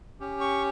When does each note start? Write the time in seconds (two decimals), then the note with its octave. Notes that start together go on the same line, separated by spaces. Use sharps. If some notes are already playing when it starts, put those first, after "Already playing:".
0.20 C#4 G4
0.41 C#6